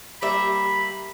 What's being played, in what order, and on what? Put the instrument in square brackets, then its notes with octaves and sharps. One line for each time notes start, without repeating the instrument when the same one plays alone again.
[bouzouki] G3 A#3 E5 [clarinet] B5